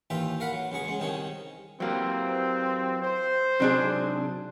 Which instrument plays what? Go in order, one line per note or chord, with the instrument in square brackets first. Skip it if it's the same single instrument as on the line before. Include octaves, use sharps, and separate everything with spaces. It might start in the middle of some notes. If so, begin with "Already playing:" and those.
[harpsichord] D#2 E3 F4 E5 G5
A#4 F5 F#5 B5
F#3
C#2 F#3 G#4 C#6
G#3
C2 D#3 D#4 G#4 C#5
[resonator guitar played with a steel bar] E3 A#3 [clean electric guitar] F#3 G4 [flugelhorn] C4
[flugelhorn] C5
[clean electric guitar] C3 F#3 [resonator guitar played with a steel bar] C4 D4 G#4